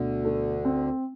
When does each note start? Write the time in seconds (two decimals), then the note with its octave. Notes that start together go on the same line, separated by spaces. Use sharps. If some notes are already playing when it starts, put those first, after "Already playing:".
Already playing: D2 B2 D3
0.25 A3
0.65 C4